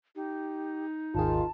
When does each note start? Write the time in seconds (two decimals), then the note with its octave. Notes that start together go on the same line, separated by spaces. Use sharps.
0.16 D#4 G4
1.15 G#1 D#2 D#3 F4 G#4 A5